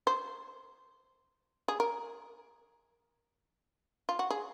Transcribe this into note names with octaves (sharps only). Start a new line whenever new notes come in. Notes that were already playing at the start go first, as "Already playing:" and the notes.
C5
G#4
A#4
F4
F#4
G#4